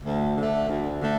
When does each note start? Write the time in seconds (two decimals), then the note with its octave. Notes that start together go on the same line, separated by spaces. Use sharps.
0.04 D2
0.37 D3 A3
0.69 D2
1.02 D3 A3